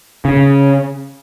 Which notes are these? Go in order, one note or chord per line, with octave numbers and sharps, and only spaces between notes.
C#3